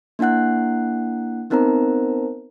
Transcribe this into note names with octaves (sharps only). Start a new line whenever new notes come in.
A#3 D4 E4 F#5 F#6
B3 C4 D#4 A#4 C5 A#5